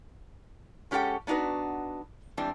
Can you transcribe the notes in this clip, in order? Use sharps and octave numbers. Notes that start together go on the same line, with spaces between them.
G#3 C#4 G4 A4 F#5 G5
B3 D4 D#4 F#4 B4
E3 G3 G#3 C4 D4